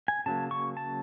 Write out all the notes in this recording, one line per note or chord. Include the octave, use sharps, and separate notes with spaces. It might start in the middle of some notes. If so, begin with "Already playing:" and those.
G#5
C#3 F#3 A#3 A5
C#6
A5